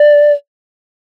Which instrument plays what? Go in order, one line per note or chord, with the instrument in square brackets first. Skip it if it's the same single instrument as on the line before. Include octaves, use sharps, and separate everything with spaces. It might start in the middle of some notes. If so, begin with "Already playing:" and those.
Already playing: [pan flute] D5